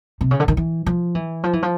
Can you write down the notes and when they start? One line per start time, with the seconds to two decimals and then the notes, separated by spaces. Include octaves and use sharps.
0.21 C3
0.31 C#3
0.40 D3
0.48 D#3
0.57 E3
0.86 F3
1.15 E3
1.44 F3
1.53 E3
1.63 F3